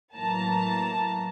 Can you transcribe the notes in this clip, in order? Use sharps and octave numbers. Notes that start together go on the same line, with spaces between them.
A2 E3 F#3 A#3 A5 A#5